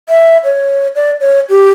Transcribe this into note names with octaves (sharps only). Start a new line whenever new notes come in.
E5
C#5
D5
C#5
G4